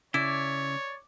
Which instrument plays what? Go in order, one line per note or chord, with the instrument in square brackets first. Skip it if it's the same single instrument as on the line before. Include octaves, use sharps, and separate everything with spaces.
[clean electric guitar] C#3 [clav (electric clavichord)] E4 [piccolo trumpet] C#5 [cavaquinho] D5